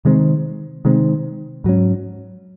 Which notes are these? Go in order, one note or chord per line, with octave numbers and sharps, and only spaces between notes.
C3 D#3 G#3 C4
C3 D#3 G#3 C4
G#2 F#3 C#4